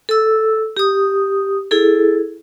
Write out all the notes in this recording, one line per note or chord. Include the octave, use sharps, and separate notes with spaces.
A4 E6
G4 D#6
E4 G#4 A4